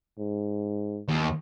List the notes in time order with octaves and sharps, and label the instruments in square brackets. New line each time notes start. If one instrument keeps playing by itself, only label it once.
[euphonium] G#2
[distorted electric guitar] D#2